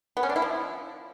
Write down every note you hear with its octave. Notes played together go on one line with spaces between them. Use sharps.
B3
C#4
D4
E4
F3